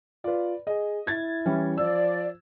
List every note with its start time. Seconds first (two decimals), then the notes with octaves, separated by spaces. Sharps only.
0.24 F4 B4 D5
0.67 G#4 D#5
1.07 E4 G#6 A6
1.45 E3 G3 C#4
1.78 F3 D5 E6